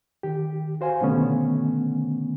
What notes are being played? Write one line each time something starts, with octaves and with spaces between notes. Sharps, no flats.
D#3 G4
F#4 C5 F5 G#5
B2 D3 D#3 A3 B3 C#4